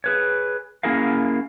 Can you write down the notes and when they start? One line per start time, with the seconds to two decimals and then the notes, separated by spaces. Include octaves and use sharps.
0.04 G#4 B4 C#5
0.83 A#3 C#4 E4 G#4 A#4 F5